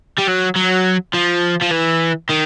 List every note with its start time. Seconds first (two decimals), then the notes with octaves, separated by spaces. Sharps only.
0.19 G3
0.28 F#3
0.56 F#3
1.14 F3
1.62 F3
1.72 E3
2.29 D#3